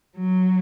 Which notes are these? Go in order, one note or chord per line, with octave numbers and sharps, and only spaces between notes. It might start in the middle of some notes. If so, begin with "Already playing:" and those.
F#3